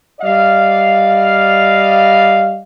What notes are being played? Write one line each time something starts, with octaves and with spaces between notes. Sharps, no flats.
G3 D5 D#5 F5